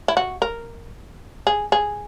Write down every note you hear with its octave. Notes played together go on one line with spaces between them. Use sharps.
E4
F#4
A#4
G#4
G#4